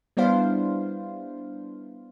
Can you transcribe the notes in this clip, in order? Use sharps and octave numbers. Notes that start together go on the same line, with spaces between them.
G3 B3 D4 E4 C5 F5